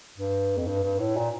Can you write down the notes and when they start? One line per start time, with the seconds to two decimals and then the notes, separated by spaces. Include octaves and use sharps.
0.18 G2
0.58 F2
0.67 G2
0.84 G2
0.99 A2
1.17 A#2